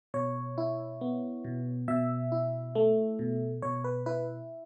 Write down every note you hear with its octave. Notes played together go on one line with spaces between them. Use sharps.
B2 C#5
E4
B3
B2
B2 E5
E4
A3
B2
B2 C#5
B4
E4 B4